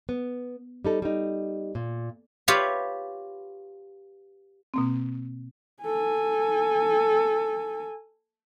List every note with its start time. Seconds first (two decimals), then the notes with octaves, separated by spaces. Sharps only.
0.09 B3
0.84 G3 D#4 A4
1.02 G3 D#4
1.75 A#2
2.48 F4 G4 B4 C#5 E5
4.74 B2 A#3 C4
5.83 A4 G#5